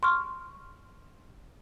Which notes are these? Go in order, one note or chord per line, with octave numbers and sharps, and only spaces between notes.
C6 C#6 F6